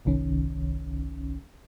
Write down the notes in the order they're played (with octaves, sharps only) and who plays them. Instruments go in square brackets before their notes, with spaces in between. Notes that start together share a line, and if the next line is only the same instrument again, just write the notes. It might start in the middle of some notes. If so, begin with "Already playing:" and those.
[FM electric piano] G1 C2 D#3 C#4